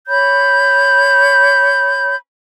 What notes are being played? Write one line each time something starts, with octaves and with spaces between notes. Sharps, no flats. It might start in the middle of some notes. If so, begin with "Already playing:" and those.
C#5 B5 G6